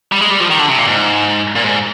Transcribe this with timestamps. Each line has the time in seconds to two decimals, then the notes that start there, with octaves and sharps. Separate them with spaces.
0.12 G3
0.21 G#3
0.31 G3
0.40 F3
0.50 D#3
0.59 D3
0.69 C3
0.78 A#2
0.88 G#2
1.55 A#2
1.64 G#2